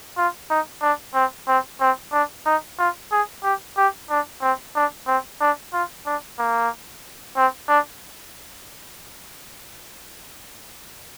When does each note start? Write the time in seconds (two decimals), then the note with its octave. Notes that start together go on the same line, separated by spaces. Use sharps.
0.17 F4
0.50 D#4
0.82 D4
1.15 C4
1.48 C4
1.81 C4
2.13 D4
2.46 D#4
2.79 F4
3.12 G#4
3.44 G4
3.77 G4
4.10 D4
4.42 C4
4.75 D4
5.07 C4
5.41 D4
5.73 F4
6.06 D4
6.39 A#3
7.37 C4
7.69 D4